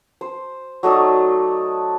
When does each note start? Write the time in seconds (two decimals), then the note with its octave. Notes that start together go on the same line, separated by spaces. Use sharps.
0.21 C5
0.83 F#3 A3 D#4 D5